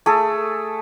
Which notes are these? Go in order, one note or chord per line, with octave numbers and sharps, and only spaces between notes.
A3 G#4 A4